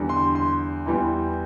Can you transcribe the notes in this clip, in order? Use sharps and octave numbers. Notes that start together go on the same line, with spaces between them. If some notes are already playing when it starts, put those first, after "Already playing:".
Already playing: E2 D3 G3
C6
C6
E2 E3 G3